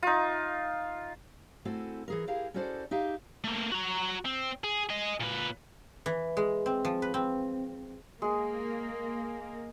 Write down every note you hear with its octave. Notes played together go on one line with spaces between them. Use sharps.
D#4 F4
A3 C4 E4 F#4 A4 G#5
E3 G#4 A#4
E4 G4 G#4 A#4 F5
C#4 E4 F#4 A4 C5 D5
D#4 G4 E5 F5
A3 A#3
F#4 A#5
C4
G#4
G#4 D#5
A#2 B4
E3
G#3
C4
F3
B4
C4
G#3 A#3 G#4